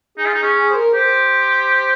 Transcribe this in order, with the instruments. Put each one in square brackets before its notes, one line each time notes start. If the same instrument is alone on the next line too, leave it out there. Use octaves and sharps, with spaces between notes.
[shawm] D#4 [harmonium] G#4
[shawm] F4
[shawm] D#4 [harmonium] G#4
[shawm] C#4
[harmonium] G#4
C5
A#4
[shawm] G4 [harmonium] C5